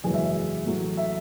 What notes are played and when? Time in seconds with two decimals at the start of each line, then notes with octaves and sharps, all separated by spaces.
0.04 F#1 E2 B2 G#3 G#4
0.14 E5
0.24 E5
0.66 A1 A2 F#3 A3
0.97 E5